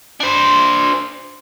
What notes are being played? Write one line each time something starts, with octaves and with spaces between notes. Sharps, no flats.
D4 C5